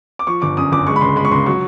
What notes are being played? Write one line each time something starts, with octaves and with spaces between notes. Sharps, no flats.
D6
F3 C#6
G1 D6
F#2 D#6
G1 D6
G#3 C#6
B5
C#2 C6
G#3 B5
C#6
C#2 C6
F#3 C#6